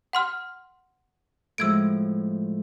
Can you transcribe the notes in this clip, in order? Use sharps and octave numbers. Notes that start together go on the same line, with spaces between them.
F#5 C6 F6
A2 F3 G#3 E6 G#6 D7